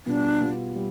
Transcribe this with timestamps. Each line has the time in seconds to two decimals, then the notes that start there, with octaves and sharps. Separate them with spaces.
0.06 B2 G3 B3 D4 F4
0.41 B2 G3 B3 F4
0.76 G3